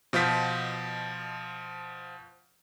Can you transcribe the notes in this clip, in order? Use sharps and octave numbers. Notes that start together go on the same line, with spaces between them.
B2 F3 F5 G6 B6